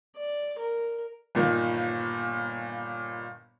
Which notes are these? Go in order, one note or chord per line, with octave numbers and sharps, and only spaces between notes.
D5
A#4
G1 A#2 D#3